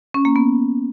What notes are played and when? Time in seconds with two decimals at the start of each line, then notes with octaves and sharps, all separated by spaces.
0.14 C#4
0.25 A#3
0.36 B3